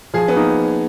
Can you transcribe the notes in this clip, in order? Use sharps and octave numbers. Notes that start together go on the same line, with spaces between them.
F3 G#4
B3
A#3 D#4